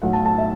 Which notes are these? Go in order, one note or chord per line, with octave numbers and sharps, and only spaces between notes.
B1 A2 F#3 F#5
A5
A5
E5